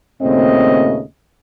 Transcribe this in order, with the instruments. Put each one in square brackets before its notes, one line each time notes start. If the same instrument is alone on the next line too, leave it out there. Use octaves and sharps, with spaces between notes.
[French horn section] D#2 A#2 C#3 A3 C4 D#5